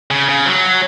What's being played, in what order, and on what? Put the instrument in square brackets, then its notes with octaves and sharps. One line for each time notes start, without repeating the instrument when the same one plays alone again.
[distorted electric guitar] C#3
C#3
F#3